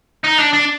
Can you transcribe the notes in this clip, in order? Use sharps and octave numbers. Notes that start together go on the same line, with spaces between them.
D#4
D4
D4